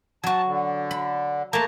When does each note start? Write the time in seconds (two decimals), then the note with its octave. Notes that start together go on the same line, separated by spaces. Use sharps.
0.24 F#3 F#4 A5
0.46 D3
0.91 B5
1.53 A3 A#3 A5 A#5